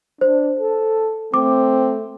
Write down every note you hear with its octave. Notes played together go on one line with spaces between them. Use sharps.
D4 C5
A4
A3 C4 D6